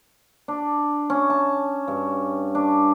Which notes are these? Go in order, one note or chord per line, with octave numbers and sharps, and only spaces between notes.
D4
C#4
A5
G2
D4